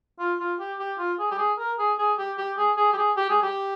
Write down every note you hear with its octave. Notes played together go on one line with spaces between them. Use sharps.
F4
F4
G4
G4
F4
G#4
G4
G#4
A#4
G#4
G#4
G4
G4
G#4
G#4
G4
G#4
G4
G#4
G4